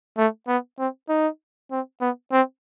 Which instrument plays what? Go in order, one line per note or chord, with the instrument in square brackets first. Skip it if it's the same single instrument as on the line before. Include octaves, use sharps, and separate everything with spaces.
[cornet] A3
B3
C4
D#4
C4
B3
C4